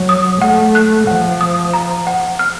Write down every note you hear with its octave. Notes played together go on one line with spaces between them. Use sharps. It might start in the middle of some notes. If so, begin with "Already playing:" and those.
Already playing: F#3
D#6
A3 F#5
F#6
F3 F#5
D#6
A#5
F#5
F6